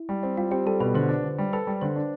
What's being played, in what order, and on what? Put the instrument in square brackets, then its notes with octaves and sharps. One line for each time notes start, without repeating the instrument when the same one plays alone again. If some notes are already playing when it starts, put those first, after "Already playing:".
Already playing: [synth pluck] E4
[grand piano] G3
C4
[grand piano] G3 [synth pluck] F4
[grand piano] C4 [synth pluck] G4
[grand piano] G3 [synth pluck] A4
[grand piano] B2 [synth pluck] B4
[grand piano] D3 [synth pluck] C5
[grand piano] D4
D3
G3
[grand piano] A4 [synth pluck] B4
[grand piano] G3
[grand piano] D3 [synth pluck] C5
[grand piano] D4